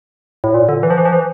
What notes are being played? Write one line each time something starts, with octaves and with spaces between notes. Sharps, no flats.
A2
A#2
D3
E3
F3
E3
F3
E3